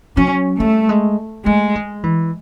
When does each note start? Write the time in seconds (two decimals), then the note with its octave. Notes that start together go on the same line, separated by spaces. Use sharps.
0.17 F#3 C#4
0.59 G3 A3
0.89 G#3
1.46 G#3 A3
1.75 G#3
2.03 E3